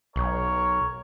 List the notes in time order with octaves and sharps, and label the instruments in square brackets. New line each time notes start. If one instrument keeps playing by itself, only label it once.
[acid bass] B1 [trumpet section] A#4 C#5